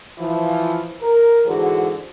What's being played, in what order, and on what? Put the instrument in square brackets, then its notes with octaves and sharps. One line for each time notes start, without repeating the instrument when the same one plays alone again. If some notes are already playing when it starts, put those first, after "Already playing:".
[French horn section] E3 F3 F4
A#4
G#2 D3 E3 F#4 G#4 C5